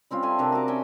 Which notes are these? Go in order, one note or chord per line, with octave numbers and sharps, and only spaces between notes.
G3 C4 C#4 F4
A4 E5 G#5
C3 D4 A#4 A#5
F#4 A5 D6
C#4 G5 G#5 C#6